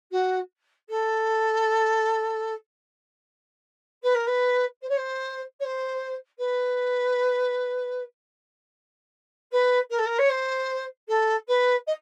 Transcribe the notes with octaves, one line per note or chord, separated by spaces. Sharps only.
F#4
A4
B4
A#4
B4
C5
C#5
C5
C#5
C5
B4
B4
A#4
A4
A#4
C#5
C5
A4
B4
D#5